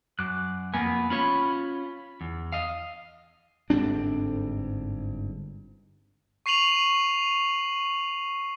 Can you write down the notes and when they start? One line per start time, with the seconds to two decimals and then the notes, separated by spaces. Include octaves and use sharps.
0.19 F#2 D6 F#6
0.74 F2 A#3 B3 G#5
1.10 C#4 F4 C#5 B5
2.21 E2
2.52 D#5 F5
3.70 G1 G#2 C4 D4
6.46 C#6 C7 D#7 F7 F#7